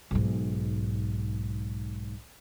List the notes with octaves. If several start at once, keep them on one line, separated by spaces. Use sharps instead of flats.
B1 G#2